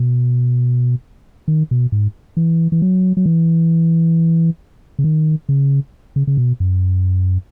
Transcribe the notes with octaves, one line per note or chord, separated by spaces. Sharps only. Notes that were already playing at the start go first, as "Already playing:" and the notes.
Already playing: B2
D#3
B2
G#2
E3
E3
F#3
F#3
E3
C#3
D#3
C#3
C#3
C#3
B2
F#2